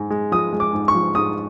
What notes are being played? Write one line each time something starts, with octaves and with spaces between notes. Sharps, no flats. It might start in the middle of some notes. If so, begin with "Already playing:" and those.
Already playing: G#2 G#3
G#3
F3 D#6
G#3
D6
G#2
C#6
F3
G#2 D#6